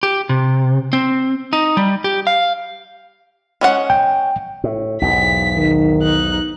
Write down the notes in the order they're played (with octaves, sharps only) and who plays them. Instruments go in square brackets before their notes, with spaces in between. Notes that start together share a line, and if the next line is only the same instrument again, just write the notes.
[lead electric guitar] G4
C3
C4
D#4
G3
G4
F5
[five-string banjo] G#3 C#4 F#5
[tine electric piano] G5
[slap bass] A2
[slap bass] B1 E2 G#2 [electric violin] B6
[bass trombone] D#3
[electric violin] D#4 F#6